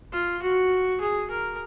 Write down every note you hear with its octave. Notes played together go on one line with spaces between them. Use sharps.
F4
F#4
G#4
A#4